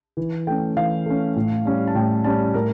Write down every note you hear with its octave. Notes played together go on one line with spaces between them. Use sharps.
E3
A3 C#4 G5
E3 F5
A3 C#4
A2
G3 C#4
A5
A2 G5
G3 C#4 A5
A2 A#4